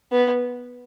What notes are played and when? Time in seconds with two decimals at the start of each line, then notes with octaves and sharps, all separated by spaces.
0.12 B3